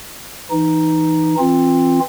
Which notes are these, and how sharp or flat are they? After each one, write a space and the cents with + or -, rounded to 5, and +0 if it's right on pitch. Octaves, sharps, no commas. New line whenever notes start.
E3 +0 D#4 +0
E3 +5 C4 +20 F4 +0